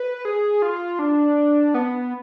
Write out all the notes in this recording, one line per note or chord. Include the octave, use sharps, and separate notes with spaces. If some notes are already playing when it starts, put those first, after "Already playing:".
Already playing: B4
G#4
F4
D4
B3